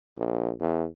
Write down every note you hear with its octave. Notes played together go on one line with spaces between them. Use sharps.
A#1
E2